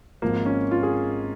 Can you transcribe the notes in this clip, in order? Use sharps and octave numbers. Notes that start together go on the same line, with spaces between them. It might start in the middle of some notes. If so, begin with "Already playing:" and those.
G#1 G#2 F3 A#3
C#4
F4
G#4